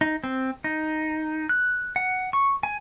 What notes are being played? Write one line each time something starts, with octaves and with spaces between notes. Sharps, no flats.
D#4
C4
D#4
F#6
F#5
C#6
G#5